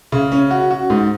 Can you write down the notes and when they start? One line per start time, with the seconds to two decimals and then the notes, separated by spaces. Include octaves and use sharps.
0.12 C#3
0.32 C#4
0.51 F#4
0.71 F#4
0.90 G#2